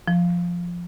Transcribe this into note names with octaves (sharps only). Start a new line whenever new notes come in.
F3